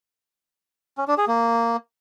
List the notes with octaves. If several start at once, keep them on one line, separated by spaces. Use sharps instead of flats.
C#4
D4
G#4
A#3